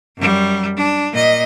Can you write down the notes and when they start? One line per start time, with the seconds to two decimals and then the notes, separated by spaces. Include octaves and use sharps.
0.17 F#2 G3
0.77 D4
1.12 A#2 D#5